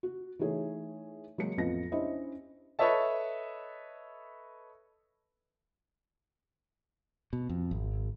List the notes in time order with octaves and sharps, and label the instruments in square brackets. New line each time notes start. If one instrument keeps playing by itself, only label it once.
[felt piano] F#4
E3 A3 D#4 G#4 C#5
F#3 G#3 A#3 C#7
A1 F2 B3 F4 D#5 A#6
C#4 D4 E4 G4 C5 D#5
[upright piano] A4 B4 C#5 D#5 E5 A5
[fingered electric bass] B2
F2
G#1